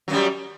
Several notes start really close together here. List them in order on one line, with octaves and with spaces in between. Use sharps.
F#3 F#2 G3